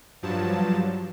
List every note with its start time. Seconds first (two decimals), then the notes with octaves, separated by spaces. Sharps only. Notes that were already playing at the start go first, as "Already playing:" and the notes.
0.22 G2 F3 F#3 A5